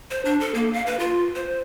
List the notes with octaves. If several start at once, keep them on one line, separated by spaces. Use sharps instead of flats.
C5
D4
A4
A#3
F5
B4
F4
C5